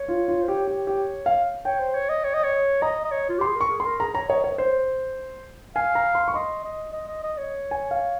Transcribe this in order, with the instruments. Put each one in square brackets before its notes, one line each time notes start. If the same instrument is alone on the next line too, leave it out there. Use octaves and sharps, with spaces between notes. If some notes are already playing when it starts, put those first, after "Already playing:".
Already playing: [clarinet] C#5
[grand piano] F4
F4
[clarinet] C5
[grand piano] G4 [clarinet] C#5
[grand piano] G4
G4
F5
[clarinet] C#5 [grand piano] G5
[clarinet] C5
C#5
D#5
C#5
D#5
C#5
[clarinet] D#5 [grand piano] A#5
[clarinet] D#5
C#5
F4
[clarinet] G4 [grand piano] C6
[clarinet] G#4
[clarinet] A#4 [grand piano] C#6
[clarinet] G#4
[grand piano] C6
[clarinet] A#4
[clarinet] G#4 [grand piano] A#5
[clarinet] C#5 [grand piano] A#5
[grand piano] C#5 [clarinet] D#5
[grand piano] C#5
C5
[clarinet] F5 [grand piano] G#5
[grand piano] A#5
C6
C#6
[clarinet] D#5 [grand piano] C6
[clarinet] D#5
D#5
D#5
D#5
C#5
[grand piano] G#5
F5